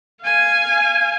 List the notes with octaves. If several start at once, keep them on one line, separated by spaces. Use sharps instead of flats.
F5 G#5